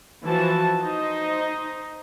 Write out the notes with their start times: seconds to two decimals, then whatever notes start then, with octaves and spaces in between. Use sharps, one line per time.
0.24 E3 F3 F#4 A5
0.81 D#4 C5 D#5